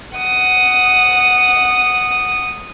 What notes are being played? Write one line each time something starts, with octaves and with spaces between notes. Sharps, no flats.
F#5 D#6